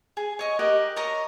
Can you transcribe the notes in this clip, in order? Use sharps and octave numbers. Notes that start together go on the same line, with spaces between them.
G#4 G#5
C#5 D#5 C#6
G4 A#4 D#5 F#5
A#4 C#5 D#5 A#5